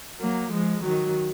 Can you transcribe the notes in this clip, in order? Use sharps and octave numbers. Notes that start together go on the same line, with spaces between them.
F#3 A#3
F3 G#3
D#3 F#3